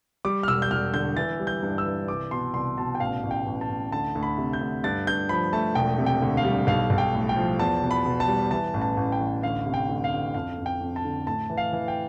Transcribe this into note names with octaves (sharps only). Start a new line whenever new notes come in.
G3 D6
F6
E1 E6
G6
E1 F6
D3 G6
E3 A6
G3
G6
G2
E6
E3
C2 D6
B2 C6
C2 C6
B2 A5
G5
A1 F5
A1
G5
A1
A5
A1
D2 A5
D2
B5
C3
G6
D2
G2 A6
G2 G6
F3 B5
A3 A5
E1 G5
C3
G5
D2
F5
G3
B1 F5
B1
G5
A2
G5
F3
E2 A5
B2
B5
B2
A5
G3
E3 A5
A1
A5
A1
G5
A1
D2 F5
C3
G5
D2
F5
D2
F2 F5
F2
G5
F2
A5
D3
A2 A5
E3
F5
E3
G5